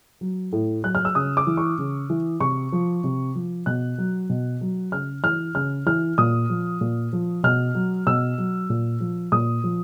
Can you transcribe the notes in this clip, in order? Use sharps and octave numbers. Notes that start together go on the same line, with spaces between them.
F#3
A2
F#3 F#6
F6
E6
C#3 D#6
D6
E3
C#6
C#3
E3
C3 C#6
F3
C3
F3
B2 F#6
F#3
B2
F#3
C#3 F6
E3 F6
C#3 F6
E3 F6
A#2 D#6
F3
A#2
F3
B2 F6
F#3
B2 E6
F#3
A#2
F3
A#2 D#6
F3